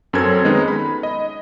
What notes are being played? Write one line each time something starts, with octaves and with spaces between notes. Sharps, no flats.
F#2 C4 C#4 A4 A#4 G#6
D#3 G#3 B3 D#4 B4
B5
D#5